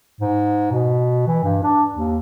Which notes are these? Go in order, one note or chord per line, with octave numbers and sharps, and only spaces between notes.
G#2
B2
E3
G2
D4
D#2